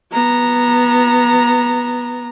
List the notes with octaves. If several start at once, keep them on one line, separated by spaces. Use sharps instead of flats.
B3 A#5